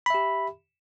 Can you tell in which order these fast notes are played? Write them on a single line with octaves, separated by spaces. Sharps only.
B5 E5 G4